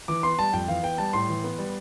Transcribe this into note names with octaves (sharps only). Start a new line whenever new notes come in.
E3 D6
B3 C6
G3 A5
F2 G5
E3 F5
B3 G5
G3 A5
A2 C6
E3
B3
G3